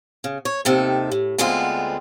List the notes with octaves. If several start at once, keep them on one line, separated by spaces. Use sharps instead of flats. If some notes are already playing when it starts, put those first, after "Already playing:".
C#3
C#5
D#2 C3 D#3 A4
A2
D2 D3 G#3 B3 C4 F4